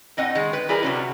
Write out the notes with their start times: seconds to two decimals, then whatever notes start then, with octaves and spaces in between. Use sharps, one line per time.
0.17 A2 C4 D#5 F#5
0.35 D#3 G#3
0.53 B4
0.69 G3 E4 G#4 A#4 B4
0.83 C3 F#3 C#4